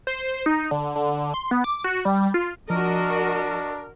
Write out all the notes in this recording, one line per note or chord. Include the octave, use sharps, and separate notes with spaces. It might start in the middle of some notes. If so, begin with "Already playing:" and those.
C5
D#4
D3
D3
C6
B3
D6
F#4
G3
F4
F3 D4 F#4 A#4 D#5